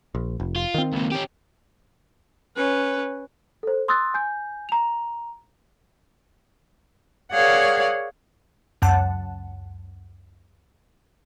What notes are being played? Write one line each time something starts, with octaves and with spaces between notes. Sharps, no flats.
A#1
F1
F4
D#3 C4
C#2 A#2
C#4 G4
C#4 B4
A4 C5
C6 D#6 E6 F#6 A6
G#5 G6
A#5 F7
G#4 A#4 C#5 D5 F5 F#5
C#2 F#2 F#5 A5